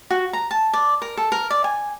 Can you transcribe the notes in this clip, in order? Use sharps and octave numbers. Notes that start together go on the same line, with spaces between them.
F#4
A#5
A5
D5
A#4
A4
A#4
D5
G#5